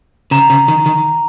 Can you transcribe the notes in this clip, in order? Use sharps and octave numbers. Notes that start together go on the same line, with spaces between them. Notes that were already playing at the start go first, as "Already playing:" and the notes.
C#3 A#5
C#3
D#3
D#3